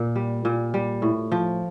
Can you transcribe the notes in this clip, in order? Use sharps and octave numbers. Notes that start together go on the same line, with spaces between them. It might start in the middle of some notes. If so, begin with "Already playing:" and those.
Already playing: A#2
G3
A#2
G3
A2
F3